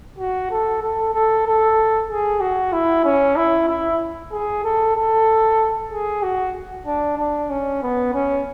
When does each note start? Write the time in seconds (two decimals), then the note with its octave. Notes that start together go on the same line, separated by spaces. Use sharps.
0.19 F#4
0.51 A4
0.82 A4
1.14 A4
1.47 A4
2.10 G#4
2.41 F#4
2.73 E4
3.05 C#4
3.36 E4
3.69 E4
4.32 G#4
4.64 A4
4.96 A4
5.92 G#4
6.23 F#4
6.87 D4
7.18 D4
7.50 C#4
7.83 B3
8.14 C#4